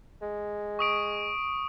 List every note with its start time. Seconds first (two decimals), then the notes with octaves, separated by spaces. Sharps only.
0.21 G#3
0.79 C#6 D#6 D7